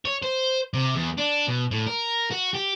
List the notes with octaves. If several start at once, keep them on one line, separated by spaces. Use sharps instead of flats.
C#5
C5
C3
E2
D4
B2
A2
A#4
F#4
G4